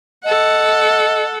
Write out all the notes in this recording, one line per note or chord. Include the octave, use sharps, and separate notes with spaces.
A4 D#5 F#5